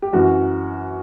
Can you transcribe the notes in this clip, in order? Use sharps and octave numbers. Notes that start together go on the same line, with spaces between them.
G4
F#2 E3 F#4